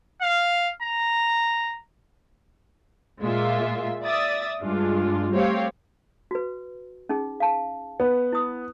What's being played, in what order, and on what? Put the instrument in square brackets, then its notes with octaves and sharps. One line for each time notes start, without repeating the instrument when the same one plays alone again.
[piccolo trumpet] F5
A#5
[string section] A#2 G#3 F4 E5
D5 E5 D#6 A6
G2 G#3 D4 F4
G3 A3 C4 G4 C#5 F5
[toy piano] F#4 B4
C#4 D#4 G#4
F5 A5
[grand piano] B3
[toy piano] E4 D#6